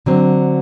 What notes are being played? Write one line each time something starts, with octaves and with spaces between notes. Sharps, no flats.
D3 F#3 C4